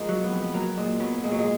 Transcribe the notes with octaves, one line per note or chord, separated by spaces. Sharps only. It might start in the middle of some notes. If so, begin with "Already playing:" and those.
Already playing: F3 G#3 A#3
F#3
B3
F2
B3
F#3 A#3
A#2 G#3
F#3 B3
A#2 G#3
F#3
G#3